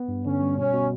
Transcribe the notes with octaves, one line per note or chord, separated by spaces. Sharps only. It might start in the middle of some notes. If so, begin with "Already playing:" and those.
Already playing: B3
G2
D3 C#4
G3
B2 C#4
B2